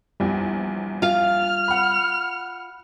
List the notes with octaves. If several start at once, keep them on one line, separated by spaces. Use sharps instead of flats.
A#1 E2 G3
F4 F5 F6
F#5 B5